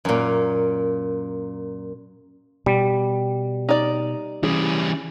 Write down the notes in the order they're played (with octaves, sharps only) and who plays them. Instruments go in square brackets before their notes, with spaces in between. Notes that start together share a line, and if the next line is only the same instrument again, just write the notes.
[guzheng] F#2 A#2
[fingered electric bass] B2 [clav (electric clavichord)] G3
[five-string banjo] D#4 D5
[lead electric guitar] E3 G3 [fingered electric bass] C#4 [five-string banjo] G#4